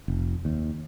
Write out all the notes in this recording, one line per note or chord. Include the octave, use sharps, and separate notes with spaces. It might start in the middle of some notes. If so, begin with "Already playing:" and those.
F1
D#2